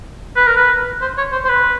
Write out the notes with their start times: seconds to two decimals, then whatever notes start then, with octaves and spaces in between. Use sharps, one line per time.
0.36 B4
0.47 A#4
0.57 B4
1.01 C5
1.17 C#5
1.32 C5
1.44 C5
1.49 B4